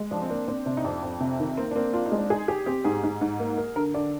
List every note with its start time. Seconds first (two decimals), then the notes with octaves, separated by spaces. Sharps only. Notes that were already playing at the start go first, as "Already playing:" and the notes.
Already playing: G#3
0.11 F3 D4
0.22 C4
0.29 A#3 D4
0.48 C4 D4
0.66 C3 D4
0.77 D#4
0.84 F2 D4
1.03 F2
1.20 C3
1.40 D#3
1.57 A#3 C4
1.71 D4
1.75 A#3 C4
1.93 D4 F4
2.06 D#4
2.12 G#3
2.18 D4
2.30 D#4 G#4
2.48 G4 G#4
2.66 C4 G4
2.84 G#2 G#4
3.03 G#2
3.21 G#2
3.40 A#3
3.58 A#4
3.76 D3 A#4
3.94 D3 D5